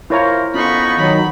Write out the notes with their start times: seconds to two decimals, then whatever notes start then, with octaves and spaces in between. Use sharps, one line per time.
0.10 E4 F4 A#4 C5 C#5 A#5
0.54 F2 B3 C#4 D#4 F4 B5 C#6
0.97 D#3 F#3 B5